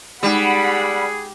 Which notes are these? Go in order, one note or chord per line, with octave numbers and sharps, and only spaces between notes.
G3 G#3 D#4 G#4 F#5 B5